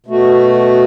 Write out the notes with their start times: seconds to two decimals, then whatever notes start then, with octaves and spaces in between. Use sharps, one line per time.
0.06 B2 A3 F#4